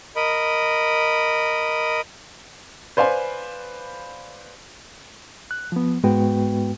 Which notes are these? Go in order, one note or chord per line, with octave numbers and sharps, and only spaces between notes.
A#4 D#5 B5
B4 C5 D5 F5 G#5 B5
F#6
F3 B3
G#2 G#3 B3 F#4 B4 G5